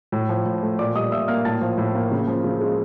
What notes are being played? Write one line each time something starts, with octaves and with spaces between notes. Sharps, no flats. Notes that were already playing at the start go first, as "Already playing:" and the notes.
A2
F3
A2
A3
A#2 D5 D6
G3 D#5 D#6
A#2 E5 E6
A#3 F5 F6
A2 A5 A6
F3
A2
A#3
C#3
F3
C#3
G#3